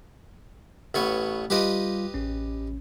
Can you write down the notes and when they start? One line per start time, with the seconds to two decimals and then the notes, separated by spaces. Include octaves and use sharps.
0.94 A1 B3 C#5
1.50 G3 F4 G4 B4 D#5
2.14 A1 C#4